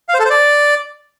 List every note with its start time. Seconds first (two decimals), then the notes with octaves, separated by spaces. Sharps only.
0.09 F5
0.14 C5
0.20 A4
0.25 C5
0.30 D5